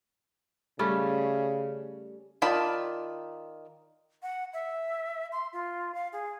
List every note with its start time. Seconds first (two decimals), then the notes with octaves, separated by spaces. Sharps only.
0.79 C#3 G3 A3 C#4
2.42 D#3 F4 D5 A5 B5
4.23 F#5
4.53 E5
5.32 C6
5.53 F4
5.95 F5
6.12 G#4